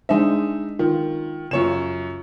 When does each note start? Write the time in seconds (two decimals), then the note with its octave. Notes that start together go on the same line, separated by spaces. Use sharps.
0.09 G#3 D4 D#4 C5 E5
0.79 D#3 F4
1.51 F#2 C#3 F4 C#5 E7